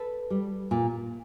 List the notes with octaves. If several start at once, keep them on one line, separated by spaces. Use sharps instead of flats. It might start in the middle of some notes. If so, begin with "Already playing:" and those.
Already playing: A4 B4
G3
A#2